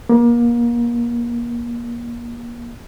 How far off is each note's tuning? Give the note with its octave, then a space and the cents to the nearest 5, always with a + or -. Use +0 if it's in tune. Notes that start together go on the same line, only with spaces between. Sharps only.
A#3 +30